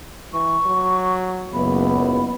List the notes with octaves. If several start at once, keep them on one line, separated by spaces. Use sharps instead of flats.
E3 C#6
F#3
F#1 C#2 B3 B5